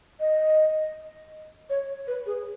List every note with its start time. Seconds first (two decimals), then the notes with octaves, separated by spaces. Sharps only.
0.20 D#5
1.70 C#5
2.07 B4
2.26 G#4